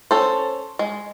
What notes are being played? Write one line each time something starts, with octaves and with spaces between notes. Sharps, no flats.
C#4 A4 C5
G#3